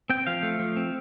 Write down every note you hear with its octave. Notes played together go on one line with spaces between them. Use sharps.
C4 G5
F3 F5
A3
F3
C4